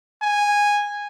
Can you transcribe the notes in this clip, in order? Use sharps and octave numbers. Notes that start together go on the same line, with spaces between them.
G#5